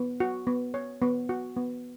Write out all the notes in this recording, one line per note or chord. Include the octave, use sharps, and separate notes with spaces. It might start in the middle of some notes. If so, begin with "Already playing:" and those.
Already playing: B3
F#4
B3
C#5
B3
F#4
B3